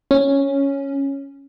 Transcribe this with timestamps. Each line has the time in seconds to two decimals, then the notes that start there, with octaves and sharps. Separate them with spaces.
0.11 C#4